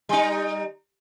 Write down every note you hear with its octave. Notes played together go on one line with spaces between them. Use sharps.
G3 D#4